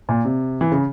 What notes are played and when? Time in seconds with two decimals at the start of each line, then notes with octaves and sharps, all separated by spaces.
0.09 A#2
0.25 C3
0.61 E3
0.72 C#3